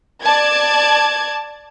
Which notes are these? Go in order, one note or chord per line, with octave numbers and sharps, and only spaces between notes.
D5 A5 G#6